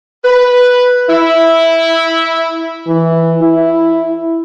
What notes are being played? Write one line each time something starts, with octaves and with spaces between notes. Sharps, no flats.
B4
E4
E3
E4